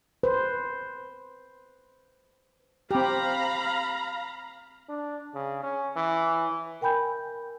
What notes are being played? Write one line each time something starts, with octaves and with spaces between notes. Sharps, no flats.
B4 C5
C4 G4 F5 A#5 B5
D4
C#3
C#4
E3
A#4 G5 G#5 B5 G6